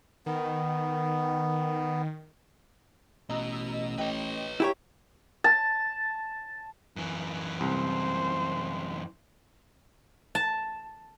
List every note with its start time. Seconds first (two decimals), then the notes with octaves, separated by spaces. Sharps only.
0.26 D#3 B3
3.30 A1 B2 D#5 A#5 E6
3.98 B4 C#5 D#5 G5
4.60 E4 G4 C#5 G5 A#5 B6
5.44 A5
6.96 F#2 E3
7.61 C2 C5
10.35 A5